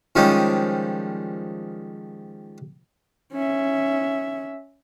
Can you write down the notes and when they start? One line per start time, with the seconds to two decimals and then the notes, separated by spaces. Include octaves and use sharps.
0.16 D#3 F3 G3 G#3 C#4
3.32 C#4 E5